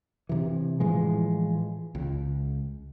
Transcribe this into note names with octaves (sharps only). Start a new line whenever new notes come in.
C3 E3
A2 E3 F3 G#3
C#2